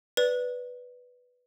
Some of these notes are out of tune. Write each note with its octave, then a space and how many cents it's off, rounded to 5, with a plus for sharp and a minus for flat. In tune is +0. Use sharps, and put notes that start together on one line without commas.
B4 +0 D5 +0